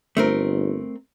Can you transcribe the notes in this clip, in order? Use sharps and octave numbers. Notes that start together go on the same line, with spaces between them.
G1 A3 C4 A#4